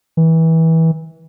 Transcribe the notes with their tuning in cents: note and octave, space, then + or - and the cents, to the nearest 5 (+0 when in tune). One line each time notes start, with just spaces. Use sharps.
E3 -25